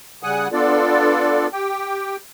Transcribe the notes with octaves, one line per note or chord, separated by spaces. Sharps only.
C#3 G3 F#5 G#5 D#6 F#6
B3 D4 F4 A4 D5
G4 G5